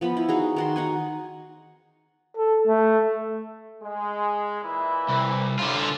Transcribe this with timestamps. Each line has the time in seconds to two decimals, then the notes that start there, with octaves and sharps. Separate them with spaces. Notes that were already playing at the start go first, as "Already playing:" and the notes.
0.01 F3 B3 F5 B5
0.17 E4
0.29 D#4 F#4 G#4
0.56 D#3 F#4 C6
0.76 D#4 F#5 G#5
2.37 A4
2.67 A3
3.82 G#3
4.62 A#2 E3 E4
5.09 C2
5.59 A1 D3 F4